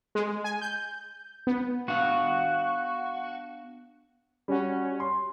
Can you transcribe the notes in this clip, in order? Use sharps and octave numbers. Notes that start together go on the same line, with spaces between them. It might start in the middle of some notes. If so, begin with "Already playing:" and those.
G#3
G#5
G6
B3
B3 D4 F#4 F5
G3 C#4 F#4
C6